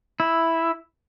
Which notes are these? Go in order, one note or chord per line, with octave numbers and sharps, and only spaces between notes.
E4